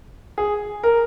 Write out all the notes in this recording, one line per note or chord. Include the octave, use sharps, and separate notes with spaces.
G#4
A#4